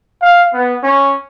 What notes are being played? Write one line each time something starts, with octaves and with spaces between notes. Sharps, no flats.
F5
B3
C#4